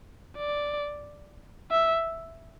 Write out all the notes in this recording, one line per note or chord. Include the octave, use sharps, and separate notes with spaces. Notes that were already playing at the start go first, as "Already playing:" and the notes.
D5
E5